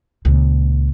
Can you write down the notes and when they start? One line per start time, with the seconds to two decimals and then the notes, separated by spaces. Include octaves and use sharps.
0.25 C#2 A#2